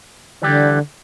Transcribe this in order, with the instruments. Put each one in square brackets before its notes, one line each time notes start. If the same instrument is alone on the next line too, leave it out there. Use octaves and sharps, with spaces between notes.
[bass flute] D3 [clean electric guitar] E3 G3 G4